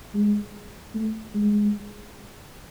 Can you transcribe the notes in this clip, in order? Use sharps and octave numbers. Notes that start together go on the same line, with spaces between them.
G#3
A3
G#3